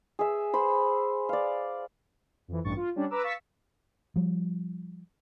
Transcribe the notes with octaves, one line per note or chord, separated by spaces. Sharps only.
G#4 E5
C5 B5
D5 F5
F2 E3
A1 G2 C#6 A6
F4
G3 C#4 D4
B4 A#5 D6 E6
F5 C#6 E6 A6 B6
F3 G3